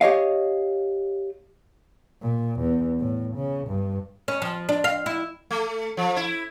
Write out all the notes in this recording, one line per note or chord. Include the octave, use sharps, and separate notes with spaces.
G4 C#5 D#5 F5
A#2
E2
A2
C#3
G2
C#4
F3
D4
F5
E4
A3
F3
E4